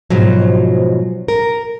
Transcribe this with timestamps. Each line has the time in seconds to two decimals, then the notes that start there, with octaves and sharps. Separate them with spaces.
0.10 G#2 B2 F3 F#3
1.28 A#4